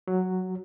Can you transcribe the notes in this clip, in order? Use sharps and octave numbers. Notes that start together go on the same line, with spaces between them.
F#3